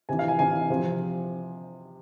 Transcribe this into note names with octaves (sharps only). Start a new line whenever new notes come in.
C3 E3 G#5
F5
G#5
C3 E3 G#5
C3 F3